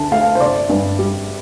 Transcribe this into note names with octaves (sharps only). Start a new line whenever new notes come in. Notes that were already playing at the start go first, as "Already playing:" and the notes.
Already playing: D2 D3 A5
A3 F5
C5
G1 D5
G2
G3